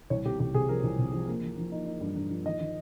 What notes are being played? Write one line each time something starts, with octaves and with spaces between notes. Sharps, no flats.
C2 C#5
C3 G4
C2 G4
C3 G#4
F3 A#4
C2
C3
F3
A#3
F3
F3
D#4
D#4
G2
G2
F3
D#3 D#5
D#3